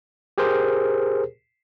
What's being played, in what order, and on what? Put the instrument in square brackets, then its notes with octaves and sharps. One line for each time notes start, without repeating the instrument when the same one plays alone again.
[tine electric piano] G4 G#4 A#4 C5